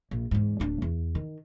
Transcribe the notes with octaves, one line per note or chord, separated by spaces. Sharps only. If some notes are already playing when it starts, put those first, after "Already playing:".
A#1
E2 G#2
D1 D4
E2
D#3